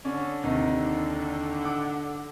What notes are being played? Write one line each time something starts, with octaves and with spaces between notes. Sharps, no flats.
D3 C#4 D5
D#2 C3 D#4
F#5 D6